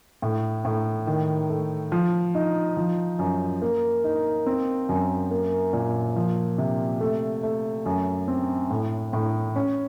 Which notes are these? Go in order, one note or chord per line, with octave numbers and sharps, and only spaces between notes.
A2
A2
D#3
A3
F3
D#4
F3
F#2
A#3
D#4
C4
F#2
A#3
A#2
F3
C3
A3
A3
F#2
C4
A2
A2
C#4